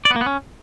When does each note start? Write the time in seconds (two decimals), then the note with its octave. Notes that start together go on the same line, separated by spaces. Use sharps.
0.05 D5
0.11 B3
0.16 A#3
0.21 B3
0.26 C#4